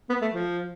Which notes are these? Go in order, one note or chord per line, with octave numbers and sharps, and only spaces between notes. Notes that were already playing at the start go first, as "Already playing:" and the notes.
B3
A3
F3